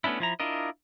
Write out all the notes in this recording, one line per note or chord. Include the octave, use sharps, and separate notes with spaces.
A3 B3 C#4 D4 E4
F3 E4 A#5
D4 E4 F4 A#4 D#5